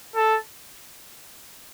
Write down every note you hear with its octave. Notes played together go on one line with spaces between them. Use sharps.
A4